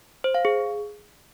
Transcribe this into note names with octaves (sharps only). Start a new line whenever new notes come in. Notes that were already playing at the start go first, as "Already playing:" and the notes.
C5
F5
G#4